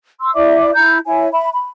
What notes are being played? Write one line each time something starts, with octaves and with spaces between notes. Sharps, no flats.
C6 E6
E4 D5 E5 D6
E4 A#5 G6
E4 C#5 E5 G#5
E5 B5
B5